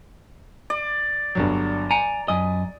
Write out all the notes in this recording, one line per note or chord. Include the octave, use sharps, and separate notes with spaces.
D5
G1 G2 F#3
G#5 A#5 C#7 D7
F#2 D#5 G#5 D#6